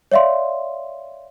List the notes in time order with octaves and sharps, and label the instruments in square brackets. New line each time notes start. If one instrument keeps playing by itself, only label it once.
[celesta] C#5 D5 E5 F5 C6